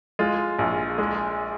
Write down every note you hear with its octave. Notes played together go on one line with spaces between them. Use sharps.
G#3 F4
A#1
G#3